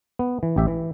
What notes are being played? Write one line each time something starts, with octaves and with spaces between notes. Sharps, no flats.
B3
E3
A1 G4 E5
E3